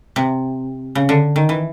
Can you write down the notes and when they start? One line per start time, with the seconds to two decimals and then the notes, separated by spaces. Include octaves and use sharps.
0.16 C3
0.95 C#3
1.09 D3
1.36 D#3
1.49 E3